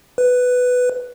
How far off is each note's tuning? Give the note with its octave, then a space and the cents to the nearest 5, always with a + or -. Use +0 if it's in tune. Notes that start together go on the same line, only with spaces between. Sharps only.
B4 +5